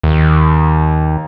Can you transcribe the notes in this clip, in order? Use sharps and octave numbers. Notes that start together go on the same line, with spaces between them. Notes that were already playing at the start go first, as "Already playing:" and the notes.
D#2